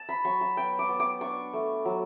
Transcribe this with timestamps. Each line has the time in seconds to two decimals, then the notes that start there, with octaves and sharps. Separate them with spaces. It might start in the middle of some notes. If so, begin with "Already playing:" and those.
Already playing: A5
0.09 B5
0.25 F#3 C#6
0.41 A5
0.57 B3 G5
0.79 D6
0.89 B3
1.00 D6
1.21 D4 C#6
1.53 A3
1.85 F#3